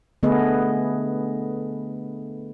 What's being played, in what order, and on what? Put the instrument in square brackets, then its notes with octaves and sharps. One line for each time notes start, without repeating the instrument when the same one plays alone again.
[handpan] D3 A3 B3 G#4 B4 D#5